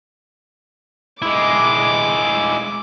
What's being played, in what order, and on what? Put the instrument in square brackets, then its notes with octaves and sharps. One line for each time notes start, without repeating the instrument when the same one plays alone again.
[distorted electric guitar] G#3 E4 [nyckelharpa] D6